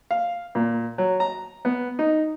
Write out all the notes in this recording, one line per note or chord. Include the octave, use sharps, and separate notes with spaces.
F5
A#2
F#3
A#5
B3
D#4